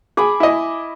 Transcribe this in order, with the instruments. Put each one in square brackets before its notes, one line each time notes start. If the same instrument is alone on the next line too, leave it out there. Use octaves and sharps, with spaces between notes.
[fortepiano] G#4 [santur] G#5 B5 D6
[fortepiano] E4 D#5